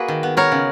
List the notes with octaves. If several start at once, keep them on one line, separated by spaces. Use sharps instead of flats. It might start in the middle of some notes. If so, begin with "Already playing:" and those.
Already playing: A#3 F#4 G#4 B4
D#3
B3
B3 A#4 C#5
C#3